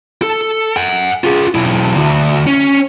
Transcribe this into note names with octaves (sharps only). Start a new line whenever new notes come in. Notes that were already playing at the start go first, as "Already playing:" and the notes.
A4
F#5 G#5
F4 G#4
B1 E4
D2
C#4